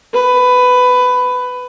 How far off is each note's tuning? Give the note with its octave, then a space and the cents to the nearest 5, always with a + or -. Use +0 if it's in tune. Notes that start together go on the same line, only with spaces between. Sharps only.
B4 +15